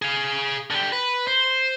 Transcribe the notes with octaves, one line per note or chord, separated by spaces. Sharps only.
G#4 F5
D3 G4
B4
C5